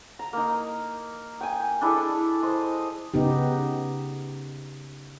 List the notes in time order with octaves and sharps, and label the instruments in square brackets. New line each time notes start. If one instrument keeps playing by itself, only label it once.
[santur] A#5
A#3 D#4
G5 G#5
D4 E4 G#4 A4
C5 D#5
[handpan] C#3 B3 D#4 G4